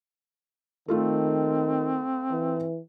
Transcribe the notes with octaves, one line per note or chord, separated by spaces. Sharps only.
D#3 A3 C4 F4 A4
E3